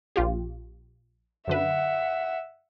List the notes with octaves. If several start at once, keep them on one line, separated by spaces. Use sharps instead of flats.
A#1 F4 G4
F#2 D3 B4 E5 F#5